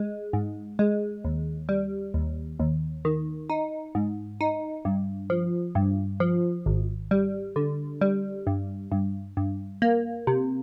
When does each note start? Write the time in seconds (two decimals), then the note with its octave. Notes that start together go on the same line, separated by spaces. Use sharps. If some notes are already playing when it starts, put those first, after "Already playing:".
Already playing: G#3
0.33 G#2
0.79 G#3
1.24 D#2
1.69 G3
2.14 D#2
2.60 D#2
3.05 D#3
3.50 D#4
3.95 G#2
4.41 D#4
4.85 G2
5.30 F3
5.75 G2
6.20 F3
6.66 G#1
7.11 G3
7.56 D3
8.01 G3
8.47 G2
8.92 G2
9.37 G2
9.82 A#3
10.27 C3